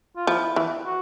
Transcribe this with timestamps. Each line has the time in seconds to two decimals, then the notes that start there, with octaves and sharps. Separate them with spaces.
0.16 F4
0.27 F3 E4
0.56 E3
0.85 F#4